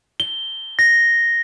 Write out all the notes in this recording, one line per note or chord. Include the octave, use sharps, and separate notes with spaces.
G7
A#6